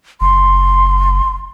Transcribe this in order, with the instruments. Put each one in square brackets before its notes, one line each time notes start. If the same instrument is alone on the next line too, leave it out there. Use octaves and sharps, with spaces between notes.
[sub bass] F#1 [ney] C6